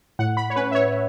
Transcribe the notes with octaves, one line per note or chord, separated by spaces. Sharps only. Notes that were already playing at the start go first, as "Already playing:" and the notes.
A2 F#5
B5
C#5
C#4 B4
E5
C#5